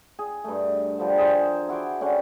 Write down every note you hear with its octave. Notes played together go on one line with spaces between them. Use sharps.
G#4
G2 A3
D3 F3 G3
G#4 A#4 C5
E4 F#4 C6 D6
D3 C#4 G4 F#5